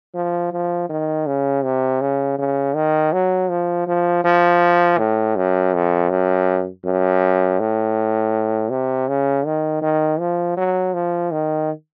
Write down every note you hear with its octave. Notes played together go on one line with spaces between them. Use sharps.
F3
F3
D#3
C#3
C3
C#3
C#3
D#3
F#3
F3
F3
F3
A2
F#2
F2
F#2
F#2
A2
C3
C#3
D#3
D#3
F3
F#3
F3
D#3